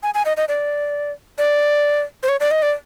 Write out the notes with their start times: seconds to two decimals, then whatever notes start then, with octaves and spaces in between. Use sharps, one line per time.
0.03 G#5
0.14 G#5
0.26 D#5
0.37 D#5
0.48 D5
1.38 D5
2.23 C5
2.29 C#5
2.40 D5
2.51 D#5
2.62 D5